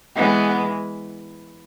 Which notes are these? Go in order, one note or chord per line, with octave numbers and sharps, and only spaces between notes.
E3 G#3 B3